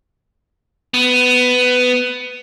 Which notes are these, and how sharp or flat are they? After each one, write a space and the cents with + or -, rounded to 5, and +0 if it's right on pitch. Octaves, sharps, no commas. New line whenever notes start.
B3 +15